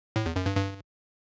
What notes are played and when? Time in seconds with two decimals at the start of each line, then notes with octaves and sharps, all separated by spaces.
0.16 A2
0.26 E2
0.36 F#2
0.46 G2
0.56 G2